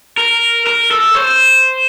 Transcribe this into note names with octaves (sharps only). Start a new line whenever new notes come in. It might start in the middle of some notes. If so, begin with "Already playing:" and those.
A#4
A#4
A4
C5